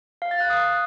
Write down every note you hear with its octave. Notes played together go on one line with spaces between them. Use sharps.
F5
A6
F#6
D#6